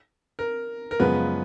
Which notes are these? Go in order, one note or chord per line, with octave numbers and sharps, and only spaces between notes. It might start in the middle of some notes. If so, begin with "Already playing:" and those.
A#4
A#4
F#2 C#3 F3 G#3 B3 B4